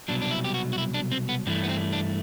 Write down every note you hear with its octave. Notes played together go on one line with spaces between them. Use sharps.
C2 B2 F#3 D4
D4
E4
G4
F#4
F#4
E4
D4
C4
B3
G2 E3 A3 C4
B3
C4
D4